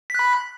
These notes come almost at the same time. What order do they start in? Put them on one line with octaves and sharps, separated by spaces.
B6 F#6 B5